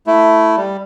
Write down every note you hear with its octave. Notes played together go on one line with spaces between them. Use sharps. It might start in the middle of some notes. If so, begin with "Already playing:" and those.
A3 E4
G3